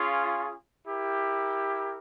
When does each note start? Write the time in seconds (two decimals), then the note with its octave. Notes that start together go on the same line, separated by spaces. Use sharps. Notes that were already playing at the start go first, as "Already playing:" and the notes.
Already playing: C#4 F4 G#4
0.86 E4 G4 A#4